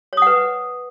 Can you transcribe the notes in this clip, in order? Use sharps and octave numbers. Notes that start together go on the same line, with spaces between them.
B4 C#5 F#5 D#6